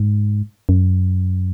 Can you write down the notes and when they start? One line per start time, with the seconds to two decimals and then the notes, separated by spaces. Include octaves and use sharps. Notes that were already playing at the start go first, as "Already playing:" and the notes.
Already playing: G#2
0.69 F#2